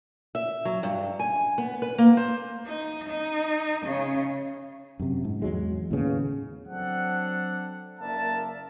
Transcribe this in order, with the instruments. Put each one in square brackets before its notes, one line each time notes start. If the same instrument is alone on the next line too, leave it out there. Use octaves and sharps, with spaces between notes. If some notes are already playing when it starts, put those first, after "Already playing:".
[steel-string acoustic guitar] E5
F#3
G2
G#5
B3
B4
A#3
C5
[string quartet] D#4
D#4
C#3
[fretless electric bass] F#2 C3
G#2
E2 F#3 G#3
D#2 A2 C#3 B3
[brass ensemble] F#3 C4 D4 A4 F#5
F#1 A#3 A#4 D5 E5 A5